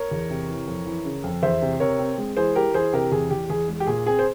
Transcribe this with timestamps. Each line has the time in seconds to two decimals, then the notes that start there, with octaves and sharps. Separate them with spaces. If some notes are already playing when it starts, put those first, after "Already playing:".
Already playing: A#4 C#5
0.11 E2
0.30 C3
0.49 E3
0.68 F2
0.86 E3
1.05 C#3
1.24 F2
1.43 E2 C5 E5
1.61 C3
1.80 C3 A#4 C#5
1.99 C4
2.18 G#3
2.37 E3 G#4 C5
2.55 E3 G4 A#4
2.74 E3 G#4 C5
2.93 C3 G4 A#4
3.12 E2 G#4
3.31 E2 G4
3.49 E2 G#4
3.68 G#3
3.80 G4
3.87 A#2 G#4
4.06 C4 G#4
4.19 C5